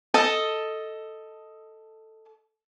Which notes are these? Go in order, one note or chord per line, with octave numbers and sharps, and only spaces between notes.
A4 D#5 A5